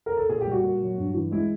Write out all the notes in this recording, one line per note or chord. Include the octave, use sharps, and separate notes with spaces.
A#4
A4
A#2 G#4
G4
G3 F#4
A#2
F#3
G2
E3
G#3 E4